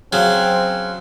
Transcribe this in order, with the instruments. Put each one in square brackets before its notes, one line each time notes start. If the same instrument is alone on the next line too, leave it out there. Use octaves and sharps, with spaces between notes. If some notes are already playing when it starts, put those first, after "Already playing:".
[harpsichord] C#3 F#3 [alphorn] C4